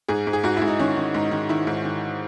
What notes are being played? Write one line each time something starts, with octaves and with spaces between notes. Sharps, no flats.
G#2 G#4
G#2
G#4
G#2 F#4
G#2 E4
D#4
D#3 C#4
D#3
G#2 D#4
D#3
D#3 E4
G#2
D#3